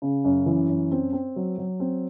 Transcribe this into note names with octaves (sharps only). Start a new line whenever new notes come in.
C#3
F#2
E3
F#2
C4
C4
F#3
F#3
C4